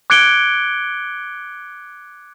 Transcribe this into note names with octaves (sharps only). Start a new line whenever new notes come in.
D6 F#6 G#6 C#7 D7 G7